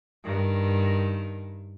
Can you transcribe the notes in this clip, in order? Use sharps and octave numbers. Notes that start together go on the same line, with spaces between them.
G2 D#3